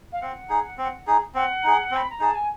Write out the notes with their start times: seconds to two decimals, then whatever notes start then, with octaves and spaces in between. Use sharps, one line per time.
0.12 F5
0.22 C4 F#5
0.49 D#4 G#4
0.78 C4
1.07 D#4 G#4
1.35 C4 F#5
1.64 D#4 G#4
1.91 C4 B5
2.10 A#5
2.20 D#4 G#4 A5
2.35 G#5